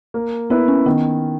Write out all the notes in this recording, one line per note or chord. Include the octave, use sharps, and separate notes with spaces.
A#3
B3 E4 B4
C#4
D#3 B3